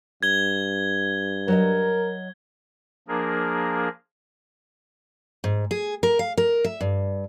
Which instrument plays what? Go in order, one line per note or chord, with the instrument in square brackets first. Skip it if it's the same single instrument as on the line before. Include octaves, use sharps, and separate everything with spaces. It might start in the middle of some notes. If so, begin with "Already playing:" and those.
[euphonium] G2 [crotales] G#6 G7
[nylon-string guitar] F#3 C#5 D#5 [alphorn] A#4
[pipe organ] F3 A#3 D4 G#4 A#4
[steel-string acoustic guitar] G#2
G#4
A#4
F5
A#4
E5
G2